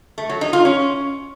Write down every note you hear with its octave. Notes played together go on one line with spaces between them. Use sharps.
A3
F#3
D#4
F4
C#4